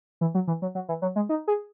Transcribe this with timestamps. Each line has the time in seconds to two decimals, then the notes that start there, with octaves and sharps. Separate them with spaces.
0.21 E3
0.35 F#3
0.47 E3
0.62 F#3
0.75 F#3
0.89 E3
1.02 F#3
1.16 G#3
1.29 D#4
1.48 G#4